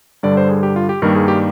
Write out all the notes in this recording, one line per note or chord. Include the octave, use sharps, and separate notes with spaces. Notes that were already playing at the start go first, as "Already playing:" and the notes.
G2 D3 G3 D5
C5
G#4
G4
F4
G4
G2 D#3 G3 A#3 A#4
G#4
G4